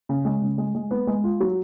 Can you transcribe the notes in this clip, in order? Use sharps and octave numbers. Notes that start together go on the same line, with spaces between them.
C#3
G#3
C#3
G#3
G#3
B3
G#3
F4
F#3